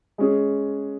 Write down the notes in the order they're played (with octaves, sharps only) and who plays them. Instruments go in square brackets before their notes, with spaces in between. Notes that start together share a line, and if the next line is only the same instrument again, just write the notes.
[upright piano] G#3 C#4 G#4